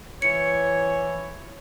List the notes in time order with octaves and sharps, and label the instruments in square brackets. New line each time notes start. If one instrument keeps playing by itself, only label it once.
[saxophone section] E3 C#5 [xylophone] C#7